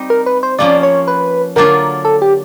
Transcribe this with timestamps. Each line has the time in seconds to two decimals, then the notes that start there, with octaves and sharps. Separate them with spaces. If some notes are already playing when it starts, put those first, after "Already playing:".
Already playing: G3 C4 D#4 G4
0.10 A#4
0.26 B4
0.43 C5
0.59 F3 A#3 C#4 F4 D5
0.83 C#5
1.08 B4
1.56 D3 F#3 A#3 D4 F4 A#4
2.05 A4
2.22 G4